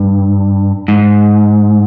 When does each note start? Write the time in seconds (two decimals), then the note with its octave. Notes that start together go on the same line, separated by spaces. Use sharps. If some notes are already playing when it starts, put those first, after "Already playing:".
Already playing: G2
0.88 G#2